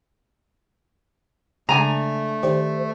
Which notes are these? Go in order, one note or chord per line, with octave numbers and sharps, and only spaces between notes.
C#3 G#3 A3 D4 G#5 A#5
D#3 G4 C5 D5